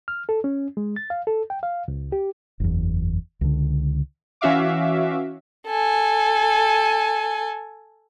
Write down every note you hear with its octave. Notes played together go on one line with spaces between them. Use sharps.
F6
A4
C#4
G#3
A6
F5
A4
G5
F5
C#2
G4
F#1 E2
C#2 D3
E3 C#4 F#4 E5 F5 D6
A4 G#5